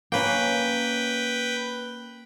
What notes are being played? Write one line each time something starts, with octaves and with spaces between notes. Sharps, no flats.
A#3 C#4 B4 G5